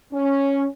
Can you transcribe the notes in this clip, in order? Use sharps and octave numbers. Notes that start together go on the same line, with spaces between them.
C#4